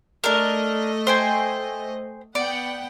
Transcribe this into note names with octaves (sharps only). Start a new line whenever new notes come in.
A3 D4 A#4 D#5
C5 G5 G#5
B3 D5 F#5 G5